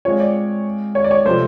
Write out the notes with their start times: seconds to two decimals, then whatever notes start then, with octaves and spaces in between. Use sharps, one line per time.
0.05 G#3 C4 F4 C#5
0.20 D5
0.95 C#5
1.04 D5
1.11 C#5
1.25 C3 F3 A3 C5